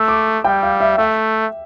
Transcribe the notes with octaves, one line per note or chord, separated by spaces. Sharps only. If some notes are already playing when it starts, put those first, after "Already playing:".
Already playing: A3 E6
D6
G3 G5
F5
E5
A3 E5